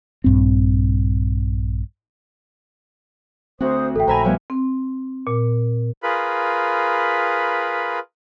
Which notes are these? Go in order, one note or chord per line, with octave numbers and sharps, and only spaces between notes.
A#1 G2 C4
D2 C4 F#4 C5 D#6
A1 A4 E5 G5
A#1 C5 E5 G#5 A#5 B5
F3 G3 B3 C#5
C4
A#2
F4 G#4 A#4 B4 B5